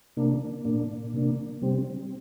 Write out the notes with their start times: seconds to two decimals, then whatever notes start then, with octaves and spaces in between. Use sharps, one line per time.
0.17 C3 A#3 D4
0.65 A#2 A#3 D4
1.13 C3 A#3 D4
1.62 C3 G3 C4